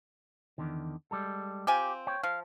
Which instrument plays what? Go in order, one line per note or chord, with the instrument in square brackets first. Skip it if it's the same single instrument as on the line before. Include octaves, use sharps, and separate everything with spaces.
[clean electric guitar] E2 D3 D#3
G3 G#3 A4
[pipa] C4 F4 G#5 [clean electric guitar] G4
[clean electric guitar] C#5 G5
[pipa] F3 [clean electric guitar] F5